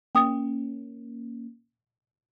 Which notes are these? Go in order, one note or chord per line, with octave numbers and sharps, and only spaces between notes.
A#3 C#4 G5 D#6